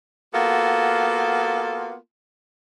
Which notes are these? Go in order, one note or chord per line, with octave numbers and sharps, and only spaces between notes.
A#3 B3 F4 F#4 A4